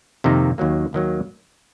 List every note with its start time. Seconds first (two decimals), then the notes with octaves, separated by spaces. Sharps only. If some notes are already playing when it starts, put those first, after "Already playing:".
0.24 F2 C3 D#3 A#3 D#4
0.58 D#2 D#3 F#3 A#3
0.93 D#2 D#3 F#3 A#3